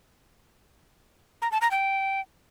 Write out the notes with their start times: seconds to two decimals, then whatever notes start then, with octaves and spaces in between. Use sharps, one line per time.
1.42 A#5
1.52 A5
1.61 A#5
1.71 G5